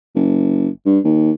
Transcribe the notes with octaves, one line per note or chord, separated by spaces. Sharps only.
F#1
G2
D#2